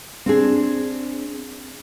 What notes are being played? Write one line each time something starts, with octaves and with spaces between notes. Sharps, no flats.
C4 D4 G#4